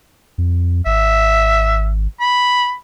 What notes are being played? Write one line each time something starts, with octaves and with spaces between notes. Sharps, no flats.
F2
G#1 E5
B5